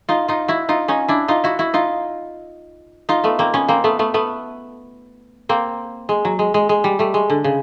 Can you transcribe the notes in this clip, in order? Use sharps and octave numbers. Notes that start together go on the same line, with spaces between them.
D#4 F4
D#4 F4
E4 F#4
D#4 F4
C#4 D#4
D4 E4
D#4 F4
E4 F#4
E4 F#4
D#4 F4
D#4 F4
A3 B3
A#3 C4
B3 C#4
A#3 C4
A3 B3
A3 B3
A3 B3
A#3 C4
G#3
F#3
G#3
G#3
G#3
G3
G3 A3
G#3
D3
C#3